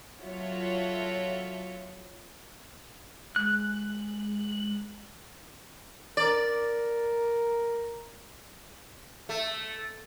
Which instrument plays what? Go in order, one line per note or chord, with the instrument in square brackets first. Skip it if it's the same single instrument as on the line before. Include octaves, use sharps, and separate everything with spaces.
[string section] F#3 F4 F#4 A4 C#5 E5
[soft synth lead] G#3 [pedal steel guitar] F#6
[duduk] A#4 [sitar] D5
[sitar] A3